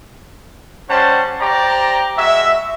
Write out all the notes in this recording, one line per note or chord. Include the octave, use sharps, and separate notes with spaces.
G3 C#4 C5 F#5 A5
G4 C5 D5 A#5
G#3 F#4 E5